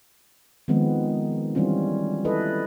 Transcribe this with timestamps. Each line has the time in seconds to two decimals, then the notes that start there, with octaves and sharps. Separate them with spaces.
0.68 D#3 F3 G#3 B3 C4
1.55 E3 G3 C4 C#4 F4
2.25 E4 A4 B4 D#5